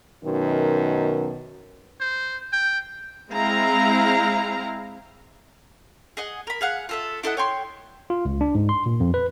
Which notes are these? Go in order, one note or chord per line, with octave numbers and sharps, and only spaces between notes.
F#2 B2 D#3
C5
G5
G#3 C4 E4 F5 A#5
G#4 D#5 F#5
A#4 B5
G#4 F5 F#5
F4 A4 E5
E4 A4 D#5 F#5
C#5 G5 C6
F4
C#2
D4
G#2
C6
A#2
F2
B4